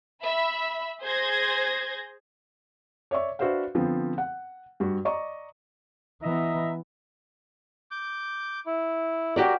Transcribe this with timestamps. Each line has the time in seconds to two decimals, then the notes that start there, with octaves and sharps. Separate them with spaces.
0.22 E5 B5
1.02 G#4 C5 G6 G#6 A#6
3.11 C#5 D5 E5 C#6
3.39 D4 F#4 B4 C5 E5 F5
3.75 D3 F3 B3 C4
4.18 F#5
4.80 G2 F#4
5.05 D5 D#5 A#5 C#6
6.22 E3 B3 D#5 E5 A#5
7.91 D6 G6
8.66 E4
9.36 F#4 G4 A#4 D5